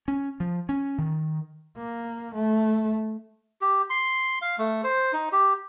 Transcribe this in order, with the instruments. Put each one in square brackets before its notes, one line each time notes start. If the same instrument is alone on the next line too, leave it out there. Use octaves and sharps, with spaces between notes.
[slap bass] C#4
F3
C#4
D#3
[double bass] A#3
A3
[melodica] G4
C6
F5
A3
C5
D#4
G4